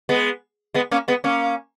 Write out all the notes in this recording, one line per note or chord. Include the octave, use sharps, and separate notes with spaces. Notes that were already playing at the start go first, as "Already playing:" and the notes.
G#3 B3
G#3 B3
A#3 C#4
G#3 B3
A#3 C#4